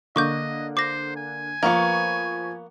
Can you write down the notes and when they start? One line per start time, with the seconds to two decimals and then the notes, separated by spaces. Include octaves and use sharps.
0.16 D3 A#3 D#5 C#6 D6 G6
0.77 C5 D6 A#6
1.16 G#5
1.63 F3 A#3 B3 C#6 C#7